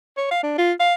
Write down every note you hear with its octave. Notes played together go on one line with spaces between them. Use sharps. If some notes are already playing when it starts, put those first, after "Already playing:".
C#5
F5
D4
F4
F5